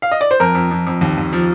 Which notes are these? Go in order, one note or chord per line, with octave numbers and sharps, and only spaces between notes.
F5
D#5
D5
C5
F2 A#4
F2
F2
F2
D#2
D#2
F3